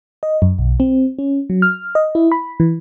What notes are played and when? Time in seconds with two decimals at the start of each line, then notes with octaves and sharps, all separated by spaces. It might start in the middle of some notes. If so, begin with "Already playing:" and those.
0.23 D#5
0.42 F#2
0.59 B1
0.80 C4
1.19 C#4
1.50 F#3
1.62 F6
1.95 D#5
2.15 E4
2.32 B5
2.60 E3